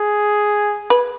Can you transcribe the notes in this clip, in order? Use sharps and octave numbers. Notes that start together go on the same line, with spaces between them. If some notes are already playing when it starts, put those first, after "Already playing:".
Already playing: G#4
B4